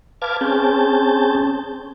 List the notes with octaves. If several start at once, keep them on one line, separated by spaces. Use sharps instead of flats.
B4 F5 A5 D6 F6 G#6
C4 C#4 G#4 A5 G6